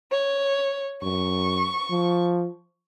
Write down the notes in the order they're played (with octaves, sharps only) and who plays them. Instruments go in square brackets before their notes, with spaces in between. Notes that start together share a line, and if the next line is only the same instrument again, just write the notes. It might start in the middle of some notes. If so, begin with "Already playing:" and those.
[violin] C#5
[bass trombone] F#2 [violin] C#6
[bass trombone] F3